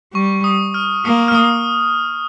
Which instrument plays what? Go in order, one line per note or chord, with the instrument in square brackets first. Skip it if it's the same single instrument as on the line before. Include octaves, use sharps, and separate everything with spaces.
[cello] G3 [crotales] C#6
[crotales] D#6
F6
[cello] A#3 [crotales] D#6
[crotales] F6
D#6